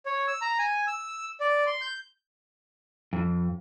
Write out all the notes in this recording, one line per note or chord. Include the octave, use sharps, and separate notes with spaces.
C#5
E6
A#5
G#5
E6
D5
C6
G6
F2